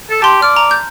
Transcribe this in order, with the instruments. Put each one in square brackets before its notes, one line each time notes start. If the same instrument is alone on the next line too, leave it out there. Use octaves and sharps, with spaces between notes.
[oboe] A4
[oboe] G4 [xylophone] A5 C6
[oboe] D5 [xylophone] F6
[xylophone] A#5
G6